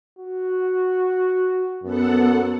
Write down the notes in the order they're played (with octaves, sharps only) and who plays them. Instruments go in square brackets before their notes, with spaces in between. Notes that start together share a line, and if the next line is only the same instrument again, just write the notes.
[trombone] F#4
[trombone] F#2 [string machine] B3 A4 F#5